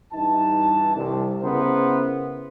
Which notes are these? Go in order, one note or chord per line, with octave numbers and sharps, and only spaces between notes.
G2 E3 D#4 A5
C2
C#3 B3 E4 A#4 C5